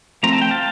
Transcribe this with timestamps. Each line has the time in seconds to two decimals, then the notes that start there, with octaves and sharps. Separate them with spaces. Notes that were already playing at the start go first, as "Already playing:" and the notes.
0.23 F3 A3 C4 A#5
0.33 A5
0.42 G5
0.51 F5 A5